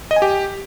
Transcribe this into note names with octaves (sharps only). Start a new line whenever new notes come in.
D#5
G#5
G4